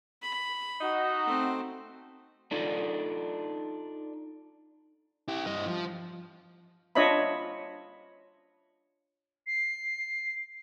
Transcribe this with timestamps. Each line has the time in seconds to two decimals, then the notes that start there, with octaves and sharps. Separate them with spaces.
0.22 B5
0.81 D#4 F#4
1.25 A3 C4
2.51 D4 D#4 F4 A4 D5
5.28 E4 G4
5.47 G2 D#5
5.66 F3
6.95 D4 F4 C#5 D#5 E5 B5
9.47 C7